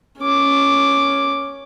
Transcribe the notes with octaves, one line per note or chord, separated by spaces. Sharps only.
C#4 D6